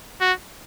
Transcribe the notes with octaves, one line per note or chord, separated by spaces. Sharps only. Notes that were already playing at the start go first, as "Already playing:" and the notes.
F#4